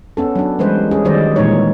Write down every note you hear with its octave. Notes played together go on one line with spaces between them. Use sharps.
B3 C#4 A4
F#3 D4
E3 G3 G#3 C#4 B4 C5
C#4 G#4
D#3 F#3 G3 C5 D5 D#5
A#2 E3 G#3 D#4 C#5